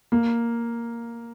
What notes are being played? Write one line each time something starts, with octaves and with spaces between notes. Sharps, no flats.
A#3